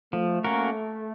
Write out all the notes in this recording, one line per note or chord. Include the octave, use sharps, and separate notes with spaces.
F3 A3
A#3 C#4 F#4 A#4